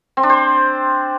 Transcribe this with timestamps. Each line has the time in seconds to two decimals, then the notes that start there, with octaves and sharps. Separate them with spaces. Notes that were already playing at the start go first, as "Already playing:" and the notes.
0.17 C4
0.23 D4
0.30 C5